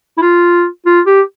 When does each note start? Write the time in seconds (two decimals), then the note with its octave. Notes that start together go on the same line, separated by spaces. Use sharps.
0.18 E4
0.22 F4
0.86 F4
1.07 G4